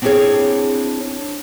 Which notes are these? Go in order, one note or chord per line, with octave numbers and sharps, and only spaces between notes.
C4 D4 E4 G4 G#4 C#5